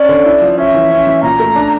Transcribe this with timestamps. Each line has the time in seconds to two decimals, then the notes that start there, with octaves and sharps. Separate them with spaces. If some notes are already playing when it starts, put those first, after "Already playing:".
Already playing: C#4 D5
0.09 D3
0.26 E4
0.42 F3
0.58 C#4 E5
0.74 E3
0.91 C#4
1.07 E3
1.22 A#2 A#5
1.40 A3
1.56 D4